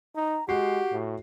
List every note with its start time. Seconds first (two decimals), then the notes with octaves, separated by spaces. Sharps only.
0.16 D#4 A#5
0.49 G#3 F#4 G4 F#5 C7
0.92 A2